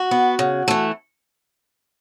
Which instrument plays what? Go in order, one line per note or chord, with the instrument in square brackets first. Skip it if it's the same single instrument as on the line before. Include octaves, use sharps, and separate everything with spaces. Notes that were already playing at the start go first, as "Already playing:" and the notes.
Already playing: [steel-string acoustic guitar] F#4
B3
C#3
E3 A3